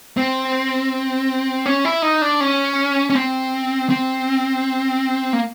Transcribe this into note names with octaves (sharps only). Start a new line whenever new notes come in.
C4
C#4
E4
D#4
D4
C#4
C#4
C4
C4
A#3